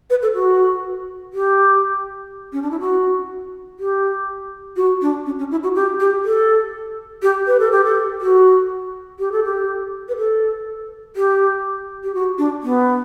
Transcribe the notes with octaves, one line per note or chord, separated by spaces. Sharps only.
B4
A4
F#4
G4
C#4
D4
E4
F#4
G4
F#4
D4
C#4
C#4
E4
F#4
G4
G4
A4
G4
B4
A4
G4
A4
F#4
G4
A4
G4
B4
A4
G4
G4
F#4
D4
B3